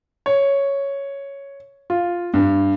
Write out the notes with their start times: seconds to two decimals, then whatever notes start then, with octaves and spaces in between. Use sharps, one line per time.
0.26 C#5
1.90 F4
2.34 G2